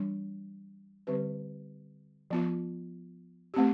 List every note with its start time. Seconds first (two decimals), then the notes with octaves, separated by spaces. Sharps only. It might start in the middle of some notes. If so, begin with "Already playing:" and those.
Already playing: E3 G3 D4
1.07 D3 G3 C4 G4 B4
2.31 F3 B3 F4
3.54 A3 C4 G4